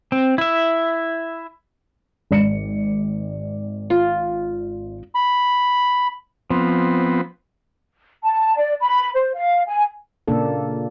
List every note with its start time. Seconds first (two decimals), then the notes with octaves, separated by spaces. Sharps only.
0.12 C4
0.38 E4 E5
2.31 G#1 D5 C#7
3.90 F4
5.15 B5
6.50 F3 B3 C4
8.25 A5
8.57 D5
8.82 B5
9.14 C5
9.35 F5
9.67 G#5
10.28 A#2 C#3 A#3 D4 A4